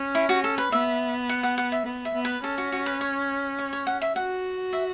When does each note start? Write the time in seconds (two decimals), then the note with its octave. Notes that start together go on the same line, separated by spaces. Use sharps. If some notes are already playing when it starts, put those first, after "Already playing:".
Already playing: C#4
0.15 E4
0.29 F#4
0.44 A4
0.58 B4
0.72 B3 E5
1.29 F#5
1.43 F#5
1.58 F#5
1.72 E5
1.86 B3
2.05 E5
2.15 B3
2.25 B4
2.44 C#4 A4
2.58 F#4
2.72 F#4
2.86 B4
3.01 C#5
3.59 C#5
3.73 C#5
3.87 F#5
4.01 E5
4.16 F#4 F#5
4.73 E5